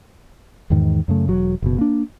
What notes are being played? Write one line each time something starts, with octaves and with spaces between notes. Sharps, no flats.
E2 G#2 D#3
F#2 C#3 A3
E1 F#3
F#1 B2
A#3 D4